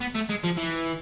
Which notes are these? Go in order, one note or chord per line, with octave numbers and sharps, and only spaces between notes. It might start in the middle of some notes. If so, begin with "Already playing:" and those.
B3
A3
G#3
F3
E3